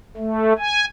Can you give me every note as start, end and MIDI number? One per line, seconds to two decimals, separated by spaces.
0.17 0.53 57
0.59 0.85 80